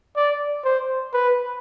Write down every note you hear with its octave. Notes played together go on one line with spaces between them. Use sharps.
D5
C5
B4